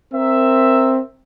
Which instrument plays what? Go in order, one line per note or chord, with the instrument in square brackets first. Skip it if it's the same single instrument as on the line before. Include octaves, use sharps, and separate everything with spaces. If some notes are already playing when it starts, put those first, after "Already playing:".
[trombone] C4 [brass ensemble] A#4 E5